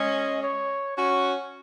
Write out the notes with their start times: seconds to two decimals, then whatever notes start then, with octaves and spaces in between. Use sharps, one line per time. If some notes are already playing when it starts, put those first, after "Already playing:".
Already playing: G#3 C#4 D#5
0.43 C#5
0.97 C#4 F#4 C#5